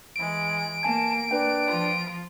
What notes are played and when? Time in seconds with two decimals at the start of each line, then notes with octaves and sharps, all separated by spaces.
0.16 E3 G#3 D7
0.83 A#3 B3 G#5 A5 G#6
1.31 D4 B4 G5
1.67 F3 F4